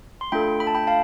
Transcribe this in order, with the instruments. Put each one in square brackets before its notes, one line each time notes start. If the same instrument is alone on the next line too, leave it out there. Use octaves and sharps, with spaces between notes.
[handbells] C6
A3 D4 F4 A4 G5 B5
B5
A5
G5 B5
F5 A5